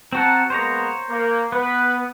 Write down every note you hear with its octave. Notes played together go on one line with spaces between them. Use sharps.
C4 F#4 F#5 A5 A#5
G#3 A#3 B3 C5 C#5 A#5
A#3
B3 B4